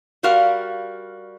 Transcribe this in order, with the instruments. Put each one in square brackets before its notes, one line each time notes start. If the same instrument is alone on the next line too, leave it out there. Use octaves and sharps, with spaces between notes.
[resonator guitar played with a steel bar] G3 F4 F#4 A#4 F5